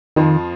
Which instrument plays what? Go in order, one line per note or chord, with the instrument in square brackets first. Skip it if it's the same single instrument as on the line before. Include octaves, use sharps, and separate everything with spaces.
[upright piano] F2 F3 [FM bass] D#3